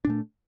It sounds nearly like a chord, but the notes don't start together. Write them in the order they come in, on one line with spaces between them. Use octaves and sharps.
D4 A#2 A3